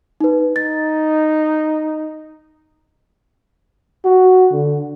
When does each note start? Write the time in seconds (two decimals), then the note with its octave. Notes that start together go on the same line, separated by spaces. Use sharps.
0.20 D#4 B4
0.56 D#4 A6
4.05 F#4
4.52 D3